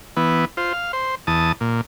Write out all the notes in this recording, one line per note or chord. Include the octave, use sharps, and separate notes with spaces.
E3 B3
F4 C5
F5
C5
E2 A5 D#6
A#2